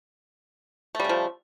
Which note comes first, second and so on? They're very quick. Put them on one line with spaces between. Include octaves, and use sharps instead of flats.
A3 G3 C#3 F3